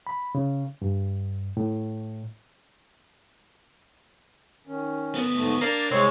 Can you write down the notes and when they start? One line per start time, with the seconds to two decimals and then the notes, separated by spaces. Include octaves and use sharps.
0.07 B5
0.35 C#3
0.82 G2
1.57 A2
4.67 D#3 C#4
5.15 D2 B3
5.34 G#2 A3
5.61 A#3 D4 D5
5.91 C2 G#3 C4 C#5